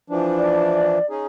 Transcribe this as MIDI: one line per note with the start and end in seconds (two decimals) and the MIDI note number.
0.10 0.98 52
0.10 0.98 53
0.10 0.98 62
0.38 1.06 74
1.10 1.26 61
1.10 1.26 63
1.10 1.26 68